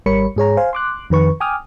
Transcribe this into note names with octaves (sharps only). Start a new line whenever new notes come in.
G#1 G3 A#4 C#5 B5 C#7
G#2 G#4 C#5 A#5
C5 F5 G#5
C6 D6 F#6
F2 D#3 B4 C#6
G5 G#5 D6 D#6 F6